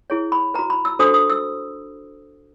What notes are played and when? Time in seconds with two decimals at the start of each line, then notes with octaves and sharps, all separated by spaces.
0.10 E4 G#4 C#5
0.32 B5
0.54 F#4 B4 A#5
0.70 B5
0.85 E6
0.99 D4 F#4 A4 C5 D#6
1.14 D#6
1.30 E6